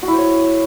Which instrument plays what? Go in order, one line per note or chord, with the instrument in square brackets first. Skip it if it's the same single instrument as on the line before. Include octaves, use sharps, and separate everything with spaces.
[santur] F#4
E4
C5
C#5